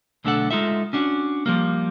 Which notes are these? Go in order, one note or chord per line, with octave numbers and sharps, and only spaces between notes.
B1 D3 A3 D4 A4 F#5
G#3 D#4 F4 A4 E5
C#4 D4 F#4
F3 G3 A#3